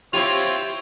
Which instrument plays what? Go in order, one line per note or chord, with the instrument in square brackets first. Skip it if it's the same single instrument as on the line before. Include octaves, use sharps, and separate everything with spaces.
[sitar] C4 E4 F4 [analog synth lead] G4 [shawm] C#5 [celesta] F7